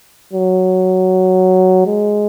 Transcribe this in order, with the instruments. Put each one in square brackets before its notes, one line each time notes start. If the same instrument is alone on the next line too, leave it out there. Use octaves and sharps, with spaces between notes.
[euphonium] F#3
G#3